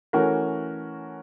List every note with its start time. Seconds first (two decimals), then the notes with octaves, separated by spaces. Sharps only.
0.13 E3 A3 C#4 F#4 A#4